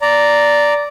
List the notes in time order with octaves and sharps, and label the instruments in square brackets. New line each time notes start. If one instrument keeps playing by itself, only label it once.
[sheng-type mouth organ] D5 A#5